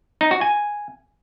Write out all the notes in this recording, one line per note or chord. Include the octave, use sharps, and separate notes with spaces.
D#4
F#4
G#5